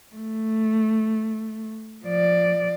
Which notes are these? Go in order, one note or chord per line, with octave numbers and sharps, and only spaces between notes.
A3
F3 D5